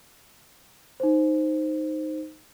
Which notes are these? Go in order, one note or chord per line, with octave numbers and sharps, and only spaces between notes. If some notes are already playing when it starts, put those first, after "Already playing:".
D#4 C5